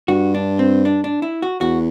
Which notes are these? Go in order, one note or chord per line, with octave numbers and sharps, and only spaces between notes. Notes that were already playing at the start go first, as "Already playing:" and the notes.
G2 F#4
D4
C4
D4
D4
E4
F#4
E2 F#4